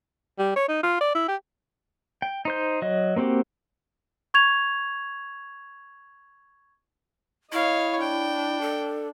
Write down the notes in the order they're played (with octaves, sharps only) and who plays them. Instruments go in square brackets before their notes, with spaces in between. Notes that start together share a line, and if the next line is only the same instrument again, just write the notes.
[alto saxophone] G3
C#5
D#4
F4
D5
E4
G4
[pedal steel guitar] G5
D#4 C5 G6
F#3 D#5
A#3 C4 F#4 G4
[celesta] C#6 G#6 F7
[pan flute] E4 [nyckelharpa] C#5 F5 [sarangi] D#5
[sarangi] D4 [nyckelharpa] G5
[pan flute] A4